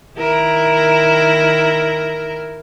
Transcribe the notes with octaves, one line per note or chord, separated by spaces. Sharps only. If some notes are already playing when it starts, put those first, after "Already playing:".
D#3 E4 A#4